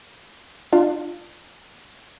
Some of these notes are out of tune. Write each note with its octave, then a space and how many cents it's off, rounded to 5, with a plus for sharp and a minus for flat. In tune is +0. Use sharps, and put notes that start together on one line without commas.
D4 +30 F4 +0